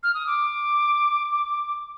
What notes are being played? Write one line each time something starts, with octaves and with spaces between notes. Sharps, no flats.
F6
D#6
D6